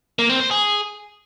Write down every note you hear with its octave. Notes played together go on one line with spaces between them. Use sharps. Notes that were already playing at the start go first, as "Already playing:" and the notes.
A#3
C4
C5
G#4